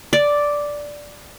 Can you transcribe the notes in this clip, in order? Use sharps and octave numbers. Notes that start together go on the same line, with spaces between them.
D5